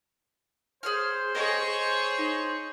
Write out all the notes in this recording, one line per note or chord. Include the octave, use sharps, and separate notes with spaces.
G#4 C5 C#5 F6
G#4 C#5 D#5
D#4